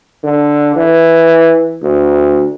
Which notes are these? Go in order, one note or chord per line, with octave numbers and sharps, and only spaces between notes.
D3
E3
D2